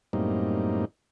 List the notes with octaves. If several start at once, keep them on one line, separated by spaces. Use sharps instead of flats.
F#2 A2 G3 A#3 C4 D#4